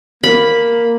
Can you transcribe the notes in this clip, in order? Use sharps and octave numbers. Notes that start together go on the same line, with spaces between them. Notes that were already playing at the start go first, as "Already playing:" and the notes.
A#3 B5